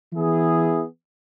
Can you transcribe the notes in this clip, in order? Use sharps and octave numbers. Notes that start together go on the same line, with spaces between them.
E3 B3 E4 G#4